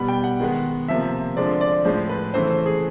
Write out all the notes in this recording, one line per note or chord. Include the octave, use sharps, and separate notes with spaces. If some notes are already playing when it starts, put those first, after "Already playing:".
Already playing: B2 G3 B3 B5
G5
F#5
D#3 G#3 B3
C3 F3 A#3 E5
D3 F3 G#3 C4 D5
D5
A2 F3 G#3 C#4 C5
B4
C#3 E3 A3 C4 C5
C5
G#4